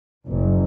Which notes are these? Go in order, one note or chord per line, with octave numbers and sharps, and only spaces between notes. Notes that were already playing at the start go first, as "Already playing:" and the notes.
F#1